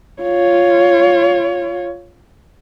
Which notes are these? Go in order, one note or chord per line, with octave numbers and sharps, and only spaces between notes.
F4 C#5